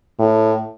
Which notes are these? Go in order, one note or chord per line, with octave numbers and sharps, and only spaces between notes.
A2